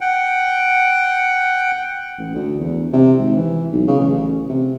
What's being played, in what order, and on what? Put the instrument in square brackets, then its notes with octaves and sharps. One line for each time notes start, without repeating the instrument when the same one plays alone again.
[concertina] F#5 G5
[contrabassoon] A1
D2
E2
C3
G#1
E3
B1
C#3
A1
C3